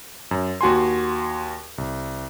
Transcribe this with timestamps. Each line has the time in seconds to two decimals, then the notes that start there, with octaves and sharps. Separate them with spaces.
0.31 F#2
0.61 D#2 F#4 G#5 C6
1.78 C2